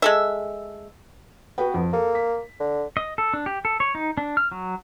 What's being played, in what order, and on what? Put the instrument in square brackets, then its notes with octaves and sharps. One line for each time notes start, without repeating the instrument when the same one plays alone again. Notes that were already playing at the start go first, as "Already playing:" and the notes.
[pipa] G#3 A4 E5
[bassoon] B3 [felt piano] F#4 B4 G5
[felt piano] F2
[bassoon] A#3 [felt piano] A4
[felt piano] B6
[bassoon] D3
[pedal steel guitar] D#5
A4
D4
G4
A4
C#5
D#4
D4
F6
F#3